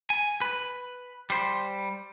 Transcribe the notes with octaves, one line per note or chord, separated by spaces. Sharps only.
G#5
B4
G3 C5